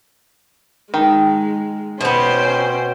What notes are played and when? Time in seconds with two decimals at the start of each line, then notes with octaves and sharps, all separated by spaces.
0.94 D#3 G#3
2.00 B2 B3 C#4 C5 G5